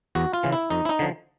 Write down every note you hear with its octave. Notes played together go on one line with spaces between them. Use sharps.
E2 F#4
F4
C#3 E3
E4
F2 D#4
E4
D#4
D3 F3